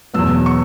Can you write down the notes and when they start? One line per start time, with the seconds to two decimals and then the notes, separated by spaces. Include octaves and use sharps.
0.14 E2 B2 F#3 B3 E6
0.46 C#6